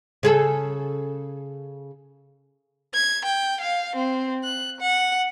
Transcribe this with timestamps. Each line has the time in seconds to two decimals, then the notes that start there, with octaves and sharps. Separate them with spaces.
0.23 C#3 G#4 A4
2.95 G#6
3.25 G5
3.61 F5
3.96 C4
4.44 F#6
4.80 F#5